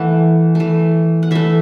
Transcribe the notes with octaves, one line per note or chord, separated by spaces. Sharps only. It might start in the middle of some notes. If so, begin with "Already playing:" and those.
Already playing: E3 A3 F#5
E3 A3
F#5
E3 A3 E5